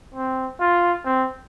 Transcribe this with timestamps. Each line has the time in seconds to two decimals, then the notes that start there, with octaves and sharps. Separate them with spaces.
0.14 C4
0.60 F4
1.05 C4